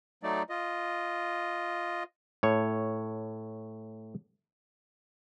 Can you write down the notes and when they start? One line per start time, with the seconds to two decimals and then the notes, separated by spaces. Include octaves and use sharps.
0.23 F#3 A3 D#4 D5
0.49 F4 D#5
2.43 A2 C#5